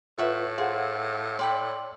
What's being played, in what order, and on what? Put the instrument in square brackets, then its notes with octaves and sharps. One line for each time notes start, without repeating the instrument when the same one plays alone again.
[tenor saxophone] A2 [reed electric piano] F4 B4 [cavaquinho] E5 F#5 C#6
[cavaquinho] G#4 C5 [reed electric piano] F5 F#5
[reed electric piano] C#5 C6 [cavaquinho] D5 G5 B5